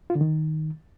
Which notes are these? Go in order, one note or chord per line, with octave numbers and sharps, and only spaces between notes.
F4
D3
D#3